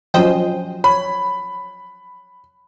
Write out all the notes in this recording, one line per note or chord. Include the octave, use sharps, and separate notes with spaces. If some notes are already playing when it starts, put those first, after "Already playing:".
F3 F#3 C#4 C5 D#5 G5
C#5 B5